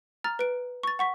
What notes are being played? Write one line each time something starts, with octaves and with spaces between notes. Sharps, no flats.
A#5 F6 A6
B4 D7
C#6 A6
F#5 C#6 B6